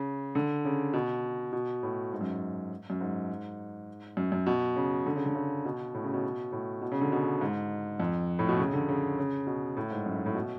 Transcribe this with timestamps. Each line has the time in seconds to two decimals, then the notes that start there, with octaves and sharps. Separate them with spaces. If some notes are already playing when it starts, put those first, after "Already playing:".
Already playing: C#3
0.35 D3
0.65 C#3
0.93 B2
1.53 B2
1.83 A2
2.12 G#2
2.21 F#2
2.90 F#2
3.00 G#2
4.17 F#2
4.32 F#2
4.47 B2
4.76 C#3
5.06 D3
5.15 C#3
5.26 D3
5.35 C#3
5.65 B2
5.94 A2
6.04 C#3
6.14 B2
6.52 A2
6.82 B2
6.92 C#3
7.01 D3
7.12 B2
7.41 G#2
8.00 F2
8.39 A2
8.49 B2
8.59 C#3
8.73 D3
8.89 C#3
9.18 C#3
9.47 B2
9.77 A2
9.91 G#2
10.06 F#2
10.15 G#2
10.26 A2
10.35 B2